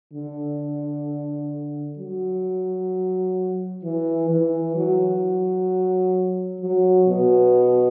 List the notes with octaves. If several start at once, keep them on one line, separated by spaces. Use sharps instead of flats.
D3
F#3
E3
E3
F#3
F#3
B2